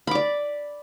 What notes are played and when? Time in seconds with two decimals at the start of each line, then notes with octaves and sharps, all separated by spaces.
0.07 B5
0.11 D6
0.15 D5